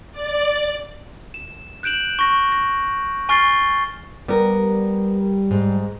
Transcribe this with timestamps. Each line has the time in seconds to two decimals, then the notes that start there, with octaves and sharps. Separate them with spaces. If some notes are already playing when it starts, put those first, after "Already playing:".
0.12 D5
1.34 E7
1.83 F#6 G6 D7 E7 F#7
2.19 C#6 A#6
2.52 A#6
3.29 G#5 C#6 F6 A6 C7 G7
4.28 G3 B3 A#4
5.51 G#2